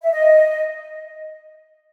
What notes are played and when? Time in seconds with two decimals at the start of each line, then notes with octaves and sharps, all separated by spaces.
0.03 E5
0.12 D#5